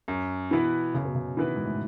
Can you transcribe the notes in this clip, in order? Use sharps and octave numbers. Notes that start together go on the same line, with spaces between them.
F#2
B2 E3 B3 E4 B4
F#2 C#3
B2
C#3
D#3 E3 B3 E4 B4
G#2
A2